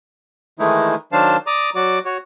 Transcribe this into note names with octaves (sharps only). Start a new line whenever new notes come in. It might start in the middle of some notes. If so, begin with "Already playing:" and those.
D#3 E3 G#3 A3 D#4 E4
D#3 F#3 D4 C5 F5 A5
D5 A#5 D6 D#6
F#3 F#4 D5 D6
F#4 C#5